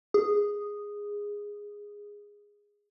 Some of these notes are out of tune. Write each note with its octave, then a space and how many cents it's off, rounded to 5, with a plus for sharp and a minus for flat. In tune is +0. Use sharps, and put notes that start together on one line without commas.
G#4 -10